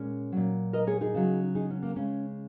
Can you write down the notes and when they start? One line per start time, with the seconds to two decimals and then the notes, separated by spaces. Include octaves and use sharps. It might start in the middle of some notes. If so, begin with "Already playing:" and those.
Already playing: A#2 G#3 C#4
0.32 A#2 F#3
0.73 A#4 D#5
0.87 G#4 C#5
1.01 D#4 G#4
1.14 C#3 F#3
1.55 D#4 G#4
1.70 C#4
1.82 A#3
1.96 C#3 G#3 C#4